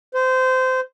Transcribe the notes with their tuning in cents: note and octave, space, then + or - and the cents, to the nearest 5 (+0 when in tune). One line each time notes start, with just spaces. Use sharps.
C5 -20